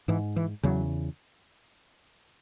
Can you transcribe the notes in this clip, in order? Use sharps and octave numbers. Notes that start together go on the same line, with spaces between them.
G#2 E3
E3
E2 C#3 F#3